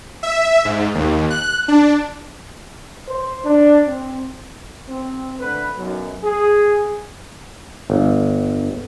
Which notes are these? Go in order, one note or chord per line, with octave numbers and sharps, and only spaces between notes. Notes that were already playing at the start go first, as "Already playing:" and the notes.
E5
G#2
D#2
F#6
D4
C5
D4
C4
C4
D3 A3 B4
B1 F#2
G#4
G1